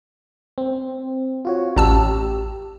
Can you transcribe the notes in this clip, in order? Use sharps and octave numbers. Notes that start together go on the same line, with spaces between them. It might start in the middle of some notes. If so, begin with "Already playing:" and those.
C4
F4 F#4 C#5
A1 G4 A5 E6